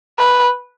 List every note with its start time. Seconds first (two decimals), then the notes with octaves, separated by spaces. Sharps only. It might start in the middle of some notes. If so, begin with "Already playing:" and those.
0.19 B4